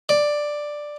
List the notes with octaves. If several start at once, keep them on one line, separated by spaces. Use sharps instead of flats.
D5